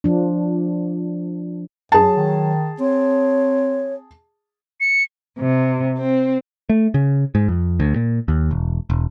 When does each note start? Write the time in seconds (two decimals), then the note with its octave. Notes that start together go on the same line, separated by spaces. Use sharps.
0.04 F3 D4
1.92 F#2 F#3 G#4 A5
2.16 D#3
2.80 C4 C#5
4.81 C#7
5.37 C3
5.98 C4
6.69 A3
6.94 C#3
7.35 G#2
7.48 F2
7.80 D2
7.96 A#2
8.28 D#2
8.51 E1
8.90 E1